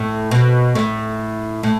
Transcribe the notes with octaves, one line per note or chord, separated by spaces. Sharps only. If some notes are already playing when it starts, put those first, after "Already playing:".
Already playing: A2
B2
A2
A2